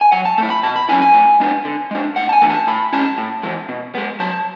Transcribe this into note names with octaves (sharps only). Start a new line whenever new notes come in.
G#5
F#3 F#5
A5
A3 E4 A5
B5
B2 A5
B5
F#3 C#4 E4 G#5
G#5
A2
G#3 B3 D4
D3
G#3 D4
A2 F#5
A5
G#5
E3 A3 D4
A5
A2 B5
G#3 C#4 E4 A5
A2
E3 G#3
B2
G#3 B3
F#3 A5